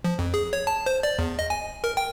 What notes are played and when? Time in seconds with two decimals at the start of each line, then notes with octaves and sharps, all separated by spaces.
0.04 F3
0.19 F2
0.34 G#4
0.53 C#5
0.67 A5
0.86 C5
1.03 D5
1.19 E2
1.39 D#5
1.50 G#5
1.84 A#4
1.97 G5